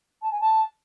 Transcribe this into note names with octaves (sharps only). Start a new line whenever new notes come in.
A5
G#5
A5